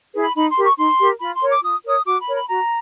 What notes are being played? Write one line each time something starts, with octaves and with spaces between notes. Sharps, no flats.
E4 G#4 B4
B5
D#4 B5
C6
G4 A#4
C#6
D#4 C6
G4 A#4
F4 B5
C6
A#4 C#5
D6
F4 D#6
A#4 C#5 D#6
F#4 D6
B5
A#4 C#5
B5
F#4 A#5